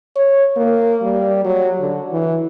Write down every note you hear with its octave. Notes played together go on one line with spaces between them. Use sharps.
C#5
A#3
G3
F#3
D3
E3